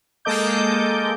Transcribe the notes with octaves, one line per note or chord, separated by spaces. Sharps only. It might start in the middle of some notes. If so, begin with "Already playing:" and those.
G#3 A#3 A4 D#5 D6 G6